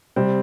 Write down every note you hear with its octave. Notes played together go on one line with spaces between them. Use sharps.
C3 G3 C4